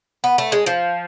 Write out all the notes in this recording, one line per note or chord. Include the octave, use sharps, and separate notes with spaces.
B3
A3
G#3
F3